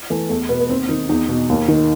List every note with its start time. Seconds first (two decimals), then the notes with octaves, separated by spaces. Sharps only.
0.10 E3 A3
0.29 E2 A3
0.49 B2 B3
0.60 B3
0.69 D#2 C4
0.89 D#3 D#4
1.09 E2 D#4
1.29 B2
1.49 D#2
1.68 D#3